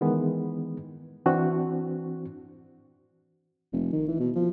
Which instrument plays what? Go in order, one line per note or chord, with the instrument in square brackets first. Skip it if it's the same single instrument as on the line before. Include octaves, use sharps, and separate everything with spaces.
[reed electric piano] D#3 E3 G#3 B3
E3 C4 D4 F#4
[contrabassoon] F1
D#3
E3
B2
F3